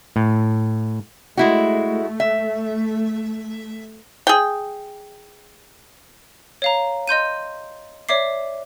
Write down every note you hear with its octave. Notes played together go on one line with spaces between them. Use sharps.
A2
G#3 A3 E4 F#4
E5
G#4 G5
C#5 F5 A#5
D#5 C6 G6 D#7
C#5 D5 E5 D6 C7